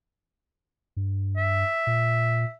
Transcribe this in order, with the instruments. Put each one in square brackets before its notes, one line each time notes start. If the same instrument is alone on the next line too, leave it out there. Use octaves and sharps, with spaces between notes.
[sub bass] G2
[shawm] E5
[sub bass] A#2